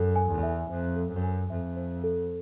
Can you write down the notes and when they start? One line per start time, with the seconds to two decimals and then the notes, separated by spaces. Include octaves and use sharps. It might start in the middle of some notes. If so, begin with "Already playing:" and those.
Already playing: F#2 A4
0.16 G#5
0.29 E2
0.43 E5
0.69 F2 C5
0.96 A4
1.09 F#2
1.23 G#5
1.50 F2 E5
1.77 C5
2.04 A4